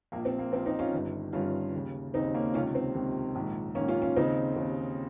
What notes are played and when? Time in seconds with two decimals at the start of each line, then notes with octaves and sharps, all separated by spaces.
0.12 A#1 A#2 A#3
0.25 C4
0.39 A#3
0.52 A#1 A#2 C4
0.66 C4 D#4
0.79 C#4 F4
0.93 G1 G2 D#3
1.33 G1 G2 D#3 C#4 F4
1.74 D#2 C#3
2.14 D#2 C#3 C4 D#4
2.34 A#3 C#4
2.54 C#2 C3 D#3 C#4 F4
2.75 C4
2.94 C#2 C3 D#3
3.35 A#1 G#2 D#3
3.75 A#1 G#2 D#3 A#3 C#4
3.88 C#4 F4
4.02 C#4 F4
4.16 D#2 C#3 C4 D#4
4.56 D#2 C#3